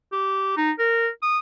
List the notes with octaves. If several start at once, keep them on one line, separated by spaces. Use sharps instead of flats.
G4
D#4
A#4
D#6